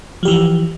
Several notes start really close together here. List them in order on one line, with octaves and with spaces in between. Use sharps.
F3 G4 E3